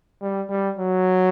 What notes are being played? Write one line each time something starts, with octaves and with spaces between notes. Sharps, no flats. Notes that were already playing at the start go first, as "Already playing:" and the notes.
G3
G3
F#3